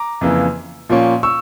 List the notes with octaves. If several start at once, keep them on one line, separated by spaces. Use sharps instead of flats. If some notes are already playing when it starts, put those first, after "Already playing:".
Already playing: A#5 D6
F2 C#3 E3 A#3
A#2 F3 A#3 C#4
C#6 E6